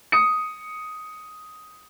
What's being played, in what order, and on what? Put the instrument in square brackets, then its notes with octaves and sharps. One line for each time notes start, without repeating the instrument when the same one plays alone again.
[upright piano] D#6 C#7